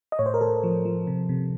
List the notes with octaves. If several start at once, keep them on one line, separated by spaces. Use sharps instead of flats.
D#5
A2 C#5
C5
A#4
A2 A4
F3
F3
C3
C3